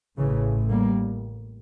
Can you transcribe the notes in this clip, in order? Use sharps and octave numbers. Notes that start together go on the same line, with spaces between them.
A1 A2 C#3 E3
G3 A#3